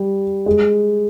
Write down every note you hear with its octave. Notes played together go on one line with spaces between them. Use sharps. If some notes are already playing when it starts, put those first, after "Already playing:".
Already playing: G3
G#3